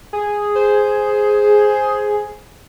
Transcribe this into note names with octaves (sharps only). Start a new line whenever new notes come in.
G#4
C5